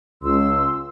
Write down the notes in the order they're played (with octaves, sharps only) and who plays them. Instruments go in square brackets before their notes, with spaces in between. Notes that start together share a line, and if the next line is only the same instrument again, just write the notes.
[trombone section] C#2 [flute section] C6 E6